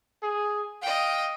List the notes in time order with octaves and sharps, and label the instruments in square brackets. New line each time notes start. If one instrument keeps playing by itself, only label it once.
[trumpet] G#4
[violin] D#5 G5 [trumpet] F5